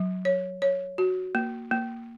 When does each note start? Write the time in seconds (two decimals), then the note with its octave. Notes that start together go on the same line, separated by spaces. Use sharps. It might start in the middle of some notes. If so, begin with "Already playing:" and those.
Already playing: F#3
0.25 C#5
0.62 C#5
0.98 F#4
1.35 A#3
1.71 A#3